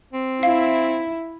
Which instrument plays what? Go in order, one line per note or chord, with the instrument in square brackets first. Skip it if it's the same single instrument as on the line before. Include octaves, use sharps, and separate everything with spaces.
[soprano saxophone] C4
[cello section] E4 [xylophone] F5